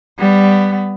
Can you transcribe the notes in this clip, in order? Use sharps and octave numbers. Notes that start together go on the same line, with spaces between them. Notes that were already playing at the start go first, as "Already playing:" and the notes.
G3 B3